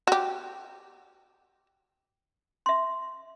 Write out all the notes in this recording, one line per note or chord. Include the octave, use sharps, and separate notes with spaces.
F#4 G4
E5 C6